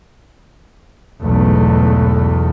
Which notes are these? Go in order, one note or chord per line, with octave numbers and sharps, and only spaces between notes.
B1 E2 G#2 A3